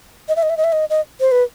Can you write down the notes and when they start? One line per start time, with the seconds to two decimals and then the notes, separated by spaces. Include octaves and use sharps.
0.29 D#5
0.36 E5
0.43 D#5
0.50 E5
0.57 D#5
0.64 E5
0.72 D#5
0.90 D#5
1.20 C5
1.32 B4